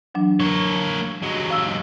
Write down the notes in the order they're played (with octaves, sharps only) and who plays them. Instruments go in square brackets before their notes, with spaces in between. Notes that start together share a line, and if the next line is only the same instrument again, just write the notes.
[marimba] E3 F#3 D4
[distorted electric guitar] A#3 C#5
F#3 G#3
[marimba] F5 E6